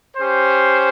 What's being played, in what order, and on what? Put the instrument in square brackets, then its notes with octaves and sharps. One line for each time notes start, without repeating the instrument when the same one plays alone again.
[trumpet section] C#4 G4 C5